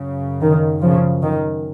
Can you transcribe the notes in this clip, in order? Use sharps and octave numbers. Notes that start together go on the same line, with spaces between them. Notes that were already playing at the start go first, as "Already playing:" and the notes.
Already playing: F#2 C#3
D#3
C#3 F3
D#3